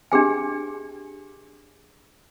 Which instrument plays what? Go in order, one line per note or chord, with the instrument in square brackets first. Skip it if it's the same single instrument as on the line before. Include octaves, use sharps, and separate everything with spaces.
[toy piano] D4 G4 G#4 G#5